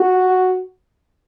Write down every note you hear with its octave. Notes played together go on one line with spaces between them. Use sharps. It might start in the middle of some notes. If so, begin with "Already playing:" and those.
Already playing: F#4